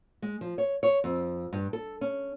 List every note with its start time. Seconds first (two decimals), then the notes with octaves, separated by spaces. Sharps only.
0.22 G#3
0.41 F3
0.58 C#5
0.83 C#5
1.04 F2
1.53 G2
1.73 A4
2.01 C#4